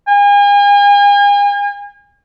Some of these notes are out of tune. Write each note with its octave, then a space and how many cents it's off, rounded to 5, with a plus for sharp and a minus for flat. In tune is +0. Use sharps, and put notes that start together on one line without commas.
G#5 -40